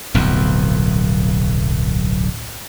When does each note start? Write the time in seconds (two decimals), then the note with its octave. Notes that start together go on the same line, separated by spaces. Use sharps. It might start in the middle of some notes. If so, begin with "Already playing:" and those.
0.14 D1 B1 F2